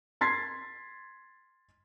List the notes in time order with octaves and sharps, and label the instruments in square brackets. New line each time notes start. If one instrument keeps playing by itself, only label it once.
[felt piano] C6 G#6 A6 B6 C7